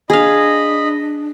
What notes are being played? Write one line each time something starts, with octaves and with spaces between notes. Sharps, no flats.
D4 G#4 D#5 F5 B5